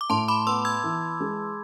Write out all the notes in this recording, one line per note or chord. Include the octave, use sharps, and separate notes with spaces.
D6
A2 A5 C6
B5 D6
B3 C6 E6
E6 G#6
E3
G#3